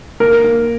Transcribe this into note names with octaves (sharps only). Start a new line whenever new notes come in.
A#3 A#4
A#3